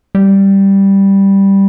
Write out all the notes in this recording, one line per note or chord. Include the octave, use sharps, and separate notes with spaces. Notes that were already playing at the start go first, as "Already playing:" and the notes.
G3